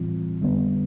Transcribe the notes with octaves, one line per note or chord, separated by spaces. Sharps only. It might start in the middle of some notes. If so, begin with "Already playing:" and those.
Already playing: A2 E3 G3 C4 F4
F2 D3 G3 B3